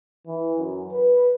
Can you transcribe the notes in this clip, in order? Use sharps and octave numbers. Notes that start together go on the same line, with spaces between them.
E3
F#2
B4